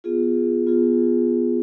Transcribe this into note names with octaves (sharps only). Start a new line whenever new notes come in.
B3 F4 G#4
B3 F4 G#4